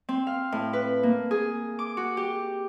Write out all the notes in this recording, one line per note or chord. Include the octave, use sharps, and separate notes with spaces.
C4
F5
A2
B4
A#3
G#4
D6
F#4
G4